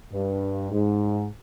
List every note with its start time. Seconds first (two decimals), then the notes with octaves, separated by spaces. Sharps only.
0.12 G2
0.71 G#2